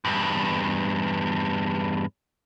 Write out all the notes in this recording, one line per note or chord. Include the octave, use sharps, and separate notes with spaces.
E2 G2